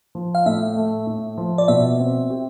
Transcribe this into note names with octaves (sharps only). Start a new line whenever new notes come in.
F3
F5
A2 E5
A3
A2
F3
D5
B2 E5
C4
G4